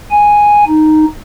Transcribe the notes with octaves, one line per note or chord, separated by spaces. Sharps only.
G#5
D#4